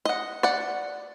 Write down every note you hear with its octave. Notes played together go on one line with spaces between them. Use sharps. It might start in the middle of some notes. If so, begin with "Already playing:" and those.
D#5 F#5
D5 F#5